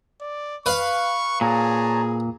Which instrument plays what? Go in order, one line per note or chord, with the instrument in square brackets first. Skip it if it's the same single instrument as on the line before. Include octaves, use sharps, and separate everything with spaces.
[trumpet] D5
[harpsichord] B4 F5 [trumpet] C#6
[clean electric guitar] A#2 [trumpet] G#4 [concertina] C#5 A5 A#5